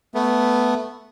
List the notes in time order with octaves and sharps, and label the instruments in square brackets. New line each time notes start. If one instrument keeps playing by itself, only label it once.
[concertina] A3 B3